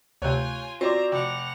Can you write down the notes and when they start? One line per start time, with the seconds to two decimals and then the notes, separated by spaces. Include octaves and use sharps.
0.22 D2 C3 F4 C#5 G#5 F#6 G6
0.81 C4 F4 F#4 C5 D5 A#5 D6
1.12 F1 F#5 G5 D6 F7